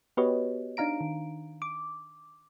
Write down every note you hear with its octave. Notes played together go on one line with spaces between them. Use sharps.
B3 F#4 G4 B4 C#5 D#5
D4 D#4 F5 A#5 D7
D#3
D6